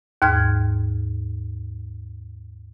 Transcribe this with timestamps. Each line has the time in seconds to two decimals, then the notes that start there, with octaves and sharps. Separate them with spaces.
0.22 D#2 G#2 F6 G#6